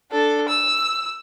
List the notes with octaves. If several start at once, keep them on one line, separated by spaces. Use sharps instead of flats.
D4 A4
E6